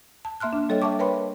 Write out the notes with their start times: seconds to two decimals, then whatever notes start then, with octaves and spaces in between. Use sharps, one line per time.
0.25 A5
0.40 A#3 E5 C6 F6 F#6
0.53 D4
0.69 G3 A4 C#5 D#5 G5
0.82 E5 G5 A5 C#6 D6
0.99 A#4 B4 C#5 G5 B5 C6